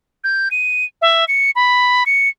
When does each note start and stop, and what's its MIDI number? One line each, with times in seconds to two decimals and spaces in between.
0.24 0.49 91
0.51 0.85 99
1.02 1.25 76
1.28 1.51 97
1.55 2.04 83
2.06 2.29 97